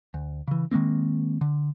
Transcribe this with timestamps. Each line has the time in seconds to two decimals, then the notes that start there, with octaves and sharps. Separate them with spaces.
0.14 D2
0.48 C#3 E3
0.71 D#3 G#3 A#3 C4
1.41 D3